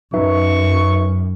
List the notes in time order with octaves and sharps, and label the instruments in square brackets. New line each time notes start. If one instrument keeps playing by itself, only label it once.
[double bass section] F#2 [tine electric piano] D#4 B4 E5 [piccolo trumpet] C#6